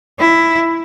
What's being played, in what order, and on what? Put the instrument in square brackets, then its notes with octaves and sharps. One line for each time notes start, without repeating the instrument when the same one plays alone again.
[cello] E4